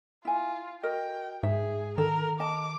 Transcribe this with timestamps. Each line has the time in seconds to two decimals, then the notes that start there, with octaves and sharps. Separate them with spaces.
0.25 E4 F4 G#5
0.83 F#4 A#4 D#5 G5
1.43 G#2 G#4 E5
1.98 D#3 A4 A#4
2.40 D#5 A5 D6